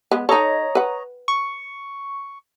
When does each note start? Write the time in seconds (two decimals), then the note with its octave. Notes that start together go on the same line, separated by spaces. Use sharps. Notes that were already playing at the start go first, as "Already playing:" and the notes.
0.11 G#3 B3
0.29 D#4 A4 C#5 D#5 A#5
0.75 B4 F#5
1.28 C#6